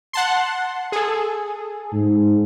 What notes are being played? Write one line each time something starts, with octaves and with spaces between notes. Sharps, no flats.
F#5 A5 C6
G#4 A4
G#2